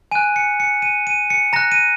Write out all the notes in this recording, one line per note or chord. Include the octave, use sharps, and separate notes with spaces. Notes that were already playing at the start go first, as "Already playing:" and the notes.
G#5 F#6 D#7
C#7
C#7
D#7
D#7
C#7
A#5 F#6 A#6
D#7